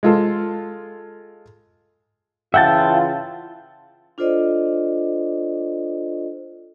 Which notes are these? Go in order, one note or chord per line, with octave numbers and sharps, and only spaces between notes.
G#3 F4 A4
C#3 E3 F4 E5 F#5 G5 A5 A6
D4 F4 A4 C5 D5 D#5